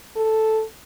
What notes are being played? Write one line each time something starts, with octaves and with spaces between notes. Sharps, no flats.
A4